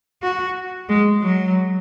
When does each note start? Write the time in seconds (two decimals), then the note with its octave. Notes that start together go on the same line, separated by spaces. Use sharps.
0.23 F#4
0.89 G#3
1.22 F#3